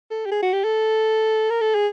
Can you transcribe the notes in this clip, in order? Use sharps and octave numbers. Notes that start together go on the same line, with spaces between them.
A4
G4
G#4
F#4
G4
A4
A#4
A4
G#4